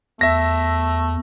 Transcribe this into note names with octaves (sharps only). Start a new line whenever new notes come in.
E2 A3 E5 A#6